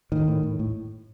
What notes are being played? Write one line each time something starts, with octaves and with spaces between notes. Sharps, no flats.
A2 D#3
A2
A2
A2